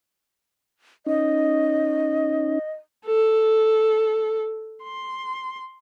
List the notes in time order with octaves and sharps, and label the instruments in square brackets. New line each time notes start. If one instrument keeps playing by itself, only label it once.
[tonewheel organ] C#4 D#4 [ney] D#5
[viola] A4
C6